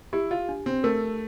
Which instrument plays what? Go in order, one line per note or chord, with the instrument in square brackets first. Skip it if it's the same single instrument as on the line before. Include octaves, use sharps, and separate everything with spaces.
[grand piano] E4 [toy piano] G4
[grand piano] F4
[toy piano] D4
[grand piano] C4
[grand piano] A3 [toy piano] A#4